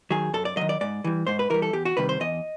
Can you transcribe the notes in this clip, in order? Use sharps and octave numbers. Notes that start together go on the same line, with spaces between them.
D#3 F#3 G#4
F#2 A4
D5
D#3 F#3 D#5
D5
G#2 D5
E3 G3
G#2 C5
B4
E3 G3 A#4
A4
E2 G4
F#4
C3 D#3 G3 B4
C5
E2 D#5